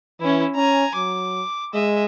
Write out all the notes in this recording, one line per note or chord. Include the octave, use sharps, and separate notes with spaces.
E3 C#4 E4
C#4 G#5 A#5
F#3 D6
G#3 D#5 E5